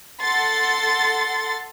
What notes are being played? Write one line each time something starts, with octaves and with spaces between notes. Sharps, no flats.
A4 F#5 C6 A6